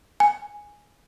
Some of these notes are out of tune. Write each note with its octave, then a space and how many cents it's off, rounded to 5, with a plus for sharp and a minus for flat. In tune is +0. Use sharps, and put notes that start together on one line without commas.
G#5 -5